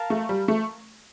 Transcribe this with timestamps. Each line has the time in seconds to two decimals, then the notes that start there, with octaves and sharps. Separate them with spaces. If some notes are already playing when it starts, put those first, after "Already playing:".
Already playing: A#4 F5 A5
0.10 A3
0.29 G3
0.48 A3